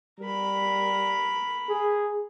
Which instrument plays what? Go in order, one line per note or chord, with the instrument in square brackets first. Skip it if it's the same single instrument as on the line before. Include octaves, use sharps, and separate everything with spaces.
[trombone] G3 [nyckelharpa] A#4 B5
[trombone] G#4